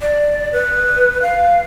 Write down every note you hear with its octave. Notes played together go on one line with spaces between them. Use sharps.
D5
B4
F5